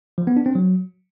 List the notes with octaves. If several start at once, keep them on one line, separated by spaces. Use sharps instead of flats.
F3
B3
D4
C4
F#3